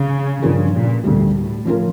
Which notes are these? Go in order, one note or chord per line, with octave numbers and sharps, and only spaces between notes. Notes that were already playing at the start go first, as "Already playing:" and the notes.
Already playing: C#3
G2 C#3 F3 C#4 F4 A#4
A#2
D2 A2 D3 G3
A2
F3 C#4 F4 A#4